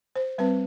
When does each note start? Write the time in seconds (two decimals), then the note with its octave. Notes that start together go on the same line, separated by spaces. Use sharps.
0.16 C5
0.38 G3 C4 B4